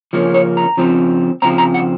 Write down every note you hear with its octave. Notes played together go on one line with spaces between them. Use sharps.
C#3 F3 A#3 C#4
C#5
A#5
C#3 F3 C4
C#3 F3 C4 A#5
A#5
F#5